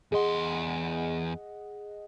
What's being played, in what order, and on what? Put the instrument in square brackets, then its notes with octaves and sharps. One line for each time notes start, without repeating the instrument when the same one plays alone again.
[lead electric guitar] E2 C6 [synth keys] G#4 D#5 F#5